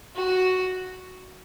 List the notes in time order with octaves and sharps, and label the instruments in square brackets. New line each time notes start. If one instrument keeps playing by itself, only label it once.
[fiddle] F#4